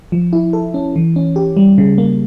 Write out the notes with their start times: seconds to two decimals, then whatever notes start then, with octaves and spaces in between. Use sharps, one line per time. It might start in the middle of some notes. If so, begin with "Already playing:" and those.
0.12 F3
0.33 E4
0.53 A4
0.74 C#4
0.96 E3
1.16 C#4
1.36 G4
1.57 G3
1.78 C#3
1.98 A#3